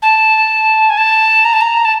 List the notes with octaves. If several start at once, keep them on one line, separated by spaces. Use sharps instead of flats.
A5
G#5
A5
A#5
A5
A#5
A5